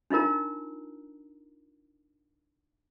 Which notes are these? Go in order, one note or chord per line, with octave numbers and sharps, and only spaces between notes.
D4 D#4 F4 A#4 A#5